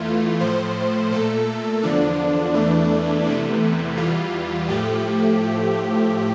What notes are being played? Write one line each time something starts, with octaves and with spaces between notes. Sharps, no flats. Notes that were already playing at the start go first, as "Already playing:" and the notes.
Already playing: E2 E3 A3 F4
A2 F3 A3 C5
A#2 A3 A4
E2 D3 F3 D4
E2 E3 A3
E2 C3 E3 A3
E2 E3 G3 F4
A2 F3 A3 G4